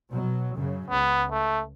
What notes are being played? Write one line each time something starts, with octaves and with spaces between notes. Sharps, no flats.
B2 F#3
F#2 C#3
C#2 B3
A3